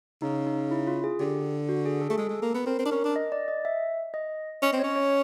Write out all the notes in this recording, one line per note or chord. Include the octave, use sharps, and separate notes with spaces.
C#3 D#4
D#4
E4
F4
G#4
D3 G4
F#4
G#4
A4
A3 G#4
G#3 A4
G#3
A#3
B3
C4 A#4
C4
D4
C#4 A#4
D4
D#5
D5
D#5
E5
D#5
C#4 D#5
C4
C#5
C#4
C#5